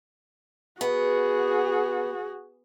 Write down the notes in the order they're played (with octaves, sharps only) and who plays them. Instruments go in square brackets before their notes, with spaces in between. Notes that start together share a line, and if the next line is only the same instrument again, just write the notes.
[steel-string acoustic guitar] B3 [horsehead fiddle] F#4 G#4